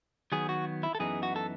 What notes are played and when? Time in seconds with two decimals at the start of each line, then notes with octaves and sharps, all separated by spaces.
0.32 D#3 F#3 B3 G#4
0.49 F#4
0.83 E4
0.95 A4
1.00 F#2 E3 B3 D#4 G#4
1.23 F#4
1.36 A4